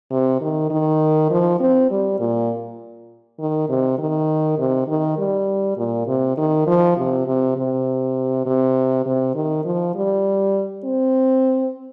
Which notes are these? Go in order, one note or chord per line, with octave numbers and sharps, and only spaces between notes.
C3
D#3
D#3
F3
C4
G3
A#2
D#3
C3
D#3
C3
D#3
G3
A#2
C3
D#3
F3
C3
C3
C3
C3
C3
D#3
F3
G3
C4